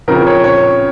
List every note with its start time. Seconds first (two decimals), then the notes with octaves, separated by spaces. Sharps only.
0.08 C#3 F3 C4 A#4
0.27 C#5
0.44 C#5